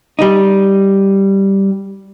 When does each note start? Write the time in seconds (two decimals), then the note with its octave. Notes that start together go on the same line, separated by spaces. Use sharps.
0.19 G3 D#4